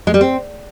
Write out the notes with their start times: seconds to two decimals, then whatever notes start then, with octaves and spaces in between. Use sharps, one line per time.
0.07 G#3
0.14 G3
0.21 C4